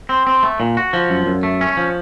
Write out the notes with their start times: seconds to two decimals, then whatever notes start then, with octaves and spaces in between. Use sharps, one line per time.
0.09 C4
0.27 C4
0.43 A3
0.60 A#2
0.77 F#4
0.93 F3
1.10 F#2
1.26 F#2
1.43 A3
1.61 C#4
1.77 F3